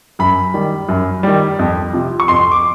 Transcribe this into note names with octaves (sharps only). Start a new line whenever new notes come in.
F#2 B5
D#3 G3
F#2
D#3 G3
F2
C3 F3
C#6
F2 C6
D6